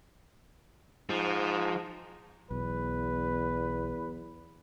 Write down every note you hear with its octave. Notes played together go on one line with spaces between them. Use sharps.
G#2 F3
B1 E2 B4